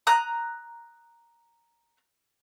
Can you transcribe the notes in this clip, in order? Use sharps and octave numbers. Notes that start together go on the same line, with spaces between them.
A#5 D#6 F#6